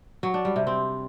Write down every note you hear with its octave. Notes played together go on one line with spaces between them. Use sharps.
F#3
D4
G3
C3
C4